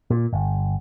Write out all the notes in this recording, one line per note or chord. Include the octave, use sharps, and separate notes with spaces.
A#2
G1